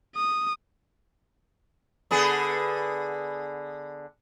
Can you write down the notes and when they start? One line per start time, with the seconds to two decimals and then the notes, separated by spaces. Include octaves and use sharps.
0.16 D#6
2.11 D3 B3 G#4